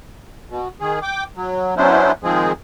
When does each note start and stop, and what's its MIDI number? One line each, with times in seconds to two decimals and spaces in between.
0.50 0.68 47
0.80 0.99 51
0.80 0.99 68
1.02 1.24 79
1.02 1.24 86
1.36 1.75 54
1.77 2.12 54
1.77 2.12 59
1.77 2.12 61
1.77 2.12 62
1.77 2.12 64
1.77 2.12 72
2.23 2.52 51
2.23 2.52 53
2.23 2.52 56
2.23 2.52 60
2.23 2.52 68